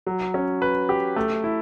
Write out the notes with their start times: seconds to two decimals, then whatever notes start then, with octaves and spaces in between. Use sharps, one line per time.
0.07 F#3
0.34 C#4
0.62 B4
0.89 G4
1.16 A3
1.44 E4